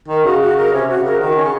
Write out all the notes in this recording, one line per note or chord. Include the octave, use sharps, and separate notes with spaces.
D#3 A#4
C#3 F#4
F#4
A#4
C3 C#4
F#4
C#3
A#4
D#3 F#4
C#4
C#3